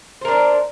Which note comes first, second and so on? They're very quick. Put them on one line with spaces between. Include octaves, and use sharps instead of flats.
C5 A#4 D4